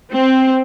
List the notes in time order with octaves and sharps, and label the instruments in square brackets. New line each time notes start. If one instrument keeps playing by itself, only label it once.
[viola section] C4